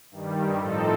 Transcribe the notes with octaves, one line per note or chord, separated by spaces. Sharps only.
G2 D#3 G3
A2 F3 C4 D#4 A4